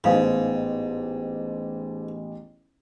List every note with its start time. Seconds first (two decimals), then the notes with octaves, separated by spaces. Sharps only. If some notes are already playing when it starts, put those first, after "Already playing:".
0.04 A1 G#2 G#3 B3 D#4 F5 D#6